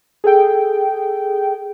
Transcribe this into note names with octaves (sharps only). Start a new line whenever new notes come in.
G#4 A4 G5